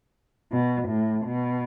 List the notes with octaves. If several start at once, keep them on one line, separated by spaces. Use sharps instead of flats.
B2
A2
B2